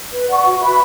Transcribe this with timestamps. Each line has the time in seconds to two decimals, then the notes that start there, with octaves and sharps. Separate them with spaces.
0.12 B4
0.29 D5 F#5 C#6
0.45 F#4
0.62 B4 E5 B5